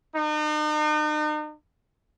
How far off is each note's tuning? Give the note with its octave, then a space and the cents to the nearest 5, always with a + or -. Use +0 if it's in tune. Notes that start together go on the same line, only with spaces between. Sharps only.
D#4 -40